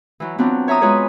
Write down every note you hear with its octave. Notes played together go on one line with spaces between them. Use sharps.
E3 F#3
F#3 B3 C4 D4 F4
C#5 E5 A#5 D#6
G#3 F4 G#4 B4 C#5